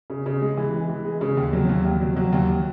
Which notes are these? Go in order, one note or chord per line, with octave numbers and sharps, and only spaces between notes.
C#3
C#3
G#3
E3
G#3
E3
G#3
C#3
D#2
F#3
D#2
D#2
F#3
F#3
D#2